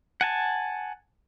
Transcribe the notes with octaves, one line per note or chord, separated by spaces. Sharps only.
F#5 G#5 A5